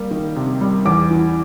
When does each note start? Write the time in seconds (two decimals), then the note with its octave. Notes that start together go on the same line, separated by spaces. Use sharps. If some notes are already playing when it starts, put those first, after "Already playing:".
Already playing: G3 A#3
0.11 D#3
0.36 C3
0.61 G3
0.85 E2 D6
1.11 E3